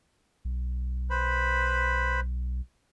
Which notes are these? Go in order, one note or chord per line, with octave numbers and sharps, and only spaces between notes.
B1
B4 C5 B5